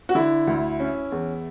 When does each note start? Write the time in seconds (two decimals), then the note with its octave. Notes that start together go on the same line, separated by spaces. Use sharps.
0.09 F#4
0.15 D3 E4
0.47 D2
0.80 C#4
1.12 E2